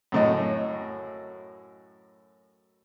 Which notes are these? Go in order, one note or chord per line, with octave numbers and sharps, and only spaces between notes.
F#2 A2 D#5